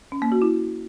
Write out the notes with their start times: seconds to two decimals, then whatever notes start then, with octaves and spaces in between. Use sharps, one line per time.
0.12 C#4
0.22 A#3
0.32 F#4
0.42 E4